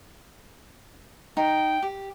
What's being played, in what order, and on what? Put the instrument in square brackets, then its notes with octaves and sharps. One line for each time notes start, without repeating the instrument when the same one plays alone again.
[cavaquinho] D#4 [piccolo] G5
[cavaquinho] G4